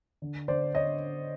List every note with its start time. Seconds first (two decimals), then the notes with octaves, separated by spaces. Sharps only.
0.22 D3
0.48 D3 C5 D5
0.75 C#5 D#5